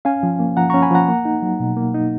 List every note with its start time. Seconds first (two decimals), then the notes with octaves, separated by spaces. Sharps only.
0.05 C#4 F5 G#5
0.23 F3
0.40 A#3
0.57 F3 F#5 A#5
0.70 C#4 A#5 C#6
0.82 G#5 B5
0.91 F3 F#5 A#5
1.08 A#3
1.25 D#4
1.42 F#3
1.60 B2
1.76 A#3
1.94 D#4